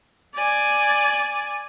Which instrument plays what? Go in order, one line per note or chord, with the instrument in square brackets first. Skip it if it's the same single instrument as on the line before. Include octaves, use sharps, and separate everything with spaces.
[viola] D5 G#5